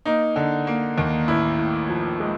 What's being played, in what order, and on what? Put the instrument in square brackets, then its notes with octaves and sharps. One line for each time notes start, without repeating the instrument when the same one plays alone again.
[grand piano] A#3 D#4
D3
A#3
D#2
A1 E4
A2
F3
G#3